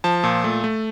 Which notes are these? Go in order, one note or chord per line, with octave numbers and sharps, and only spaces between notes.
F3 A5
A#2
A3
A3